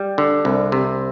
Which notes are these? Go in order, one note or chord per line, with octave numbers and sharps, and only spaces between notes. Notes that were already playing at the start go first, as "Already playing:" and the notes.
Already playing: G3
D3
C2
C3